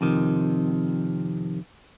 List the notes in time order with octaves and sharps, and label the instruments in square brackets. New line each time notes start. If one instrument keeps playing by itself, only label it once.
[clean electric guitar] F2 C3 D#3